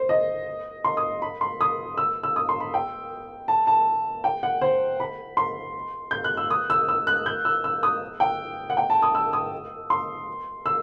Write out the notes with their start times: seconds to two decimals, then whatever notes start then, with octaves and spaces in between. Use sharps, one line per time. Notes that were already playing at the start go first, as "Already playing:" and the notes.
Already playing: C5
0.09 D#5
0.84 C6
0.97 D#6
1.22 B5
1.41 C6
1.61 D#6
1.97 E6
2.23 E6
2.36 D#6
2.49 C6
2.60 B5
2.74 G5
3.48 A5
3.67 A5
4.24 G5
4.43 F#5
4.61 C5
5.00 B5
5.37 C6
6.11 G6
6.24 F#6
6.37 E6
6.50 D#6
6.70 E6
6.89 E6
7.07 F#6
7.26 G6
7.45 E6
7.64 E6
7.83 D#6
8.20 G5
8.70 F#5
8.77 G5
8.90 A5
9.02 D#6
9.15 E6
9.33 D#6
9.90 C6
10.66 E6